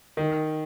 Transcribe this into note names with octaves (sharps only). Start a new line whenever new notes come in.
D#3